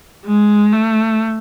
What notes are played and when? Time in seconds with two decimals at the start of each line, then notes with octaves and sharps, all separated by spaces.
0.25 G#3
0.73 A3